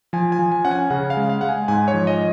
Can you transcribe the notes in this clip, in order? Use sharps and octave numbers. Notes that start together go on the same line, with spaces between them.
F3 G#5
G#5
F3
G#5
C#4 F#5
G#5
C#3 F#5
F5
G#3
F5
G#3 F#5
G#5
G#2 G#5
C#5
F3
D#5